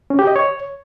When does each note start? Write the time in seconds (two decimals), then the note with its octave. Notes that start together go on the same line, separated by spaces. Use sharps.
0.10 C#4
0.19 G4
0.27 D#5
0.36 C#5